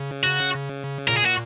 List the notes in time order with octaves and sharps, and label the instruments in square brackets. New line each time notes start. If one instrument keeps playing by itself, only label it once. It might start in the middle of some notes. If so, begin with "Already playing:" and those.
Already playing: [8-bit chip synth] C#3
[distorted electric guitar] F#4
[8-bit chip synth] A#2 [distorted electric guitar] A#4
[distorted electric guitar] G#4
F#4